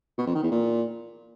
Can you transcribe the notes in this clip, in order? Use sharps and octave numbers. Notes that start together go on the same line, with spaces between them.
B2
F2
D#3
E2
A#2